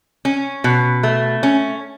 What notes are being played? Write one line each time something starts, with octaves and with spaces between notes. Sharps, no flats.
C#4
B2
A3
C#4